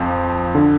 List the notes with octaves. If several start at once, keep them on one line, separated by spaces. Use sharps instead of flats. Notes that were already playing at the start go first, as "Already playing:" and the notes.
Already playing: F2 F3
D3